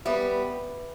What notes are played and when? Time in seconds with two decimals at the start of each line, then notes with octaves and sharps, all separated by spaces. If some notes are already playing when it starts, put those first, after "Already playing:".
0.05 G3 B3 B4 E5 B5 D6